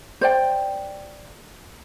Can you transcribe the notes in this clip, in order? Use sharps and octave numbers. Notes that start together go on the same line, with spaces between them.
C5 D5 G5